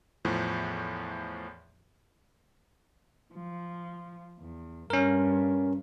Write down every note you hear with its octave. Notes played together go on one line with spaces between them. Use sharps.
E2 A2 F3
F3
E2
G2 C#4 A#4